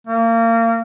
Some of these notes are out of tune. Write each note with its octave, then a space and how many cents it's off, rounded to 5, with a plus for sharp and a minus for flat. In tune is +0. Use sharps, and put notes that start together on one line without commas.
A#3 -30